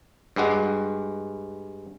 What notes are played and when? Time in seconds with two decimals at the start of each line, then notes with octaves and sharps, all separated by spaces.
0.36 G2 G3 G#3 F#4